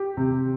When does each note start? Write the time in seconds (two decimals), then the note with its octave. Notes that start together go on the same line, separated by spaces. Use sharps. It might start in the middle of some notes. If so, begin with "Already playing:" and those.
Already playing: G4
0.17 C3